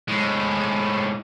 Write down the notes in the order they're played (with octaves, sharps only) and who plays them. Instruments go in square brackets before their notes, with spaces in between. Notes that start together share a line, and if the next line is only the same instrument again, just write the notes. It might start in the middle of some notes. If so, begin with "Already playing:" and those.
[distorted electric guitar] A2 G#3